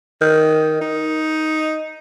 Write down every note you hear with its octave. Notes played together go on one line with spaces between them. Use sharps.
D#3
D#4